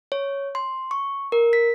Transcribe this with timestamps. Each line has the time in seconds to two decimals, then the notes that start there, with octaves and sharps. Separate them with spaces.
0.12 C#5
0.55 C6
0.91 C#6
1.32 A#4
1.53 B6